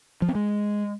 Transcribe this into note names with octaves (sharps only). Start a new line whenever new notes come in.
F3
C4
G#3